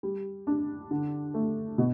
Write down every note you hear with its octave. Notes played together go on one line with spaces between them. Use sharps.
G3
D4
D3
A3
B2